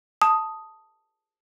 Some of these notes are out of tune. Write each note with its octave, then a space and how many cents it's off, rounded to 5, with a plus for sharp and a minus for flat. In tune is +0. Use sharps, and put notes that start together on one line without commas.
A5 +0 D#6 +0